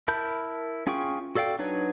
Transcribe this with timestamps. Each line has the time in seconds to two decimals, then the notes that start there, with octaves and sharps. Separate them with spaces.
0.08 E4 A#4 A5 B5 G6
0.87 C#4 F4 G#4 G5 C#6
1.35 F#4 A4 D5 F5 G5
1.59 F#3 D4 D#4 B4 C#5